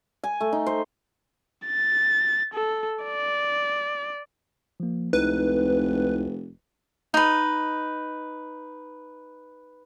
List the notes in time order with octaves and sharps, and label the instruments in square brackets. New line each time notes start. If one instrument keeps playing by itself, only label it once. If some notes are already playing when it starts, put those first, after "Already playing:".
[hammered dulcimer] G#5
A3
D#4
C5
[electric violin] A6
A4
D5
[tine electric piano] F3 A#3
[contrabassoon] F1 [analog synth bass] C#2 [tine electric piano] C4 D#4 E4 [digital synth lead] B4
[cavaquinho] D#4 B4